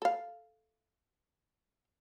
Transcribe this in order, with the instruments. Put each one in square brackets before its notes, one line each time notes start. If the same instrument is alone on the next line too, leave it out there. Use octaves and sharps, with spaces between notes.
[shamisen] A4 F5